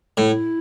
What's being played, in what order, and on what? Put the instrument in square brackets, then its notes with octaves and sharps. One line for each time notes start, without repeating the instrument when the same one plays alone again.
[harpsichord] A2 [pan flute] E4